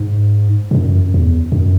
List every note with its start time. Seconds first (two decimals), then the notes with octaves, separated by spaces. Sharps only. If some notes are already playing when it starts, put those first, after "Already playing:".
Already playing: G#2
0.71 G#2
0.75 F#2
1.14 E2
1.52 F#2